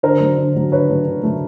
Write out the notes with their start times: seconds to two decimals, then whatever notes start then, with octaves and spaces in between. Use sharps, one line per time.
0.03 D3 A#4 C5
0.20 F#3 A3
0.38 D3
0.55 F#3 A3
0.72 D3 B4 C#5
0.89 F#3 A3
1.06 D3
1.23 F#3 A3